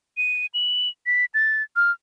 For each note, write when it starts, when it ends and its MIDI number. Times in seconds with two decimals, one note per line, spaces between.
0.17 0.46 99
0.54 0.89 102
1.06 1.25 95
1.34 1.63 93
1.76 1.91 89